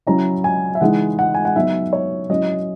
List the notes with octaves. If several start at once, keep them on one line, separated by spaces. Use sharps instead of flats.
F#3 C#4 E4 A#5
G#5
E5
E3 G#3 D#4 F#5
F#5
G#5
F#5
F#3 B3 D#4 E5
C#5
F#3 C#4 E4 D#5